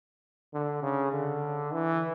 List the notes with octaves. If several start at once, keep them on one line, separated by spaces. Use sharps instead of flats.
D3
C#3
D3
E3